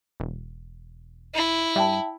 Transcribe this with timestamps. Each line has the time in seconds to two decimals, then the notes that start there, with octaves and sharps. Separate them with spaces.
0.20 E1
1.35 E4
1.76 G2 E5 G5 A5